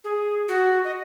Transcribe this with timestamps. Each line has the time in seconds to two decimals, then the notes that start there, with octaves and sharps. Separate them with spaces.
0.04 G#4
0.48 F#4
0.84 D#5